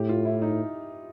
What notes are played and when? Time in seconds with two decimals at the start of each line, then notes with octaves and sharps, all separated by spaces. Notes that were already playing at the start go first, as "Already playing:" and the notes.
Already playing: A2 G4
0.09 F4
0.25 E4
0.42 D#4